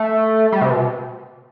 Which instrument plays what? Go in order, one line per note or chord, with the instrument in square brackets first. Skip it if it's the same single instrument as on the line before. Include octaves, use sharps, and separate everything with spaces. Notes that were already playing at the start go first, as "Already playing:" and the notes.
Already playing: [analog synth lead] A3
G3
C3
B2